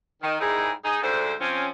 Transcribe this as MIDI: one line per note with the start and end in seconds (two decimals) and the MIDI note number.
0.23 0.36 51
0.40 0.72 44
0.40 0.72 55
0.40 0.72 63
0.40 0.72 64
0.40 0.72 68
0.40 0.72 70
0.84 1.01 63
0.84 1.01 68
1.03 1.34 38
1.03 1.34 44
1.03 1.34 50
1.03 1.34 69
1.03 1.34 72
1.41 1.68 53
1.41 1.68 60
1.41 1.68 61